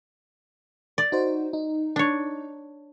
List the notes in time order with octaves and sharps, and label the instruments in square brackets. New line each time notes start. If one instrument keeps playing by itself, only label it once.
[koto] D5
[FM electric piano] D#4 F#4 C5
D#4
[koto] D4 C#5